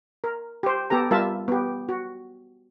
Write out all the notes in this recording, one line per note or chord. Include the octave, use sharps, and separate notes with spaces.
A#4
G4 C5
B3 G4 A4 A#5
G3 F4 A#4 E5 A5
B3 G4
F#4